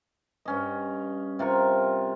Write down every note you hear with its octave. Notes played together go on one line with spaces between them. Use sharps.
G2 C#4 D#5
C3 F4 A#4 C#6